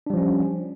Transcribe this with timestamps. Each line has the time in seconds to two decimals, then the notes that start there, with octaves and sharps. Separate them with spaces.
0.07 D4
0.10 G3
0.14 F3
0.17 C#4